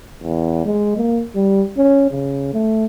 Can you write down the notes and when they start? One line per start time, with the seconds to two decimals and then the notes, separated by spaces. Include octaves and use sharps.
0.23 E2
0.65 G#3
0.97 A#3
1.35 G3
1.77 C#4
2.11 C#3
2.54 A3